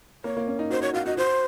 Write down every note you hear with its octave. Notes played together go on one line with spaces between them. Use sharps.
A#3 C#5
A#3
C#4
D#4
F#4 C5
F#4 C#5
F#4 F5
F#4 D#5
F#4 C5